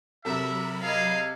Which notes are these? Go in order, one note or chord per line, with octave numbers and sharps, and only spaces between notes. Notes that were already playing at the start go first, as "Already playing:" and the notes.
C3 F#3 A4 A#4 E5 B5
G#4 D#5 F5